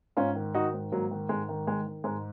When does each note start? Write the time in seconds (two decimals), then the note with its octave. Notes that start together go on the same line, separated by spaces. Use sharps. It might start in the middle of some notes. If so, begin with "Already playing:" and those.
0.17 G#2 C#4 F4
0.35 D#3
0.54 D#3 D#4 F#4
0.74 G#2
0.92 G#2 F#3 A#3
1.11 D#3
1.29 G#2 G#3
1.49 D#3
1.67 D#3 G#3
1.86 D#3
2.04 G#2 G#3